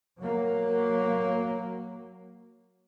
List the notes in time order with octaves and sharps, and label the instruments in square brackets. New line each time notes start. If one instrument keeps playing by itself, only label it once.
[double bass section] F#3 A#3